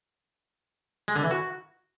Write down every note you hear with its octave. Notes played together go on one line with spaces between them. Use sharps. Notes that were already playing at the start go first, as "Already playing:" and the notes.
G#3
D3
E3
F#4